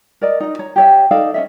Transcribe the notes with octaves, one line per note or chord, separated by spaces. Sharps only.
A#4 D5 D#5
D#4 D#5
C#5 A#5
G4 C#5 E5
D#4 A4 D5 F5
C#4 D#5 E5